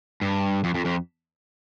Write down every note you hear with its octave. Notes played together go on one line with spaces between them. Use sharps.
G2
F2
F2
F2